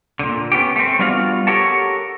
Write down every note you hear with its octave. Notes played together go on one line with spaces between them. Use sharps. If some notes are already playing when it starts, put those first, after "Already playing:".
A#2 D3
B3 C#4 G4
A3 C4
G3 B3 D4 F4 F#4 F5
G4 A4 A#4 C#5 F#5 A5